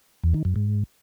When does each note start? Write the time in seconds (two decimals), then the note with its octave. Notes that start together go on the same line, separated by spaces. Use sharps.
0.24 E2
0.34 D#3
0.45 F#2
0.56 G#2